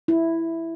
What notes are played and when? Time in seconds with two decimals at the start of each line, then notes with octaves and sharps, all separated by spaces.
0.08 E4